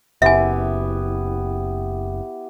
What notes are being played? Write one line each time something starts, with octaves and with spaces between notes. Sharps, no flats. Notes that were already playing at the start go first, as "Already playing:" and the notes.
F#1 B3 E4 G4 E5 G#5